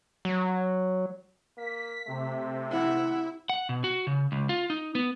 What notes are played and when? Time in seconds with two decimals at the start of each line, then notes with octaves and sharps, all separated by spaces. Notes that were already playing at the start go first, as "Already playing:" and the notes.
0.25 F#3
1.58 A#3 B6
2.07 C3 A3
2.71 E4 F#5
3.50 F#5
3.69 B2
3.84 F#4
4.07 C#3
4.32 C#2
4.49 F4
4.70 D#4
4.95 B3